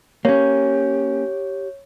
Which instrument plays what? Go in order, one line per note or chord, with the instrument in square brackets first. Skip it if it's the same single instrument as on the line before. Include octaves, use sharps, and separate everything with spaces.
[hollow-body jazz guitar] A#3 C#4 [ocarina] G4 [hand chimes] C#5